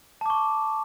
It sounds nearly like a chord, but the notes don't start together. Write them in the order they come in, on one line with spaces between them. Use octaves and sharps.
A5 D6 C#6